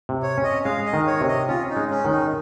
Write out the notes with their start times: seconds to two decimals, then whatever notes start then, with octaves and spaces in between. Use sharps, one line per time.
0.09 C3
0.23 C#5
0.38 C#4
0.44 D#5
0.65 G#3 F5
0.86 D#5
0.93 D#3
1.07 C#5
1.21 C3
1.28 D#5
1.48 C#4 F4
1.69 D#4
1.76 G#3
1.91 C#4
2.04 D#3
2.11 D#4